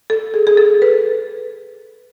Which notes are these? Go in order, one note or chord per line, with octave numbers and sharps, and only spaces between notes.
A4
G#4
G#4
A4
B4